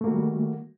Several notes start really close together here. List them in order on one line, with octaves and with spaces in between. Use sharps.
A3 A#3 F#4 D#3 G3